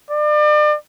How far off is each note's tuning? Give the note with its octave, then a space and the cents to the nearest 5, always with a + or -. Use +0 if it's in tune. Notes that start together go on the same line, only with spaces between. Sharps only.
D5 +35